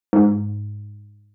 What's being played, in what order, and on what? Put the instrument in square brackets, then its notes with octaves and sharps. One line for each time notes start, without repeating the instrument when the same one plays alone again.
[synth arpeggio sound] G#2